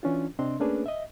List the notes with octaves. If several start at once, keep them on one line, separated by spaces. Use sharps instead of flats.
E3 C#4 D4 F4
C3 C4 D4 D#5 C6
A3 A#3 C#4 D4 G#4 B4
D#5 E5